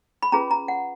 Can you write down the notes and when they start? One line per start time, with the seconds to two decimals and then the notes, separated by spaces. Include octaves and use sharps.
0.22 B5
0.32 C#4 F4 G#4 B4 A#5
0.51 A#5
0.68 F#5